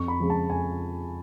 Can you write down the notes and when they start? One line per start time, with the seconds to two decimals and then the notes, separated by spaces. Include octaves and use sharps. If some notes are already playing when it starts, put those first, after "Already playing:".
Already playing: F2 C#6
0.08 B5
0.20 C#3 F3 G#3
0.30 A5
0.50 F2 G#5